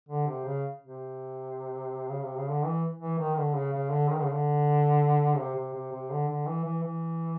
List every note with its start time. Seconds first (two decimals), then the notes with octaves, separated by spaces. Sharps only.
0.09 D3
0.27 C3
0.45 C#3
0.82 C3
2.09 C#3
2.23 C3
2.37 C#3
2.50 D3
2.65 E3
3.00 E3
3.19 D#3
3.37 D3
3.55 C#3
3.73 C#3
3.91 D3
4.09 D#3
4.18 D3
4.25 C#3
4.33 D3
5.38 C3
5.56 C3
5.74 C3
5.92 C3
6.10 D3
6.28 D3
6.47 E3
6.65 E3
6.83 E3